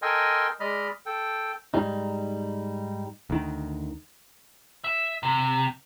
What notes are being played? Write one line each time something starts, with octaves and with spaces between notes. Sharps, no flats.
A4 A#4 D#5 G5 G#5 C6
G#3 D5 D#5 B5 F6
A4 G5
G#2 G3 D#4
D2 D#3
E5
C3